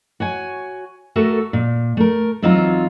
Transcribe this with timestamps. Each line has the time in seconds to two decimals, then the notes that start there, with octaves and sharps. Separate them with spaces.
0.20 F#4 C#5 G#5
1.16 A3 F#4 A4 A#4
1.53 A#2
1.97 A3 A#4
2.42 E2 F#3 C4 D#4 F4 A#5